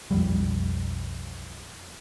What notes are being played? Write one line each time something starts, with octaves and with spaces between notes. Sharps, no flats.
B1 F2 F3 G3